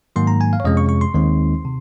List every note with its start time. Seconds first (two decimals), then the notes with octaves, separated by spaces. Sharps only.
0.16 G#2 D#3 F#3 A#3 C6
0.27 A#5
0.41 G#5
0.53 F5
0.60 C#5
0.64 F2 C3 F3 G#3 C#4 D#5
0.77 C#6
0.89 C#6
1.01 C6
1.14 D#2 D#3 G#3 C4 D#4
1.65 C3